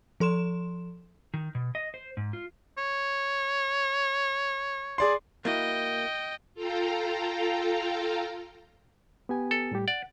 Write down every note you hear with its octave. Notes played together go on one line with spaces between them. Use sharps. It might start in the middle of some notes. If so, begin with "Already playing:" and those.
F3 A4 C6 E7
D#3
B2
D#5
C5
G#2
F4
C#5
G#4 D5 C6
A#3 E4 F#4 D#5 G5
F4 A4 F5 G5 A#5
B3 G4 G#5
A4
A2 G3 G4
D5 F#5